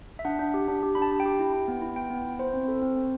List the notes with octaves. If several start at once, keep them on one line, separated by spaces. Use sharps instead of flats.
E5
D4 F#5
D4
G4
D4
G4
D4 B5
A5
D4
G5
G4
E4
E4
B3
E4
B3 G5
B3
E4
E4 C5
C4
A4
C4
C4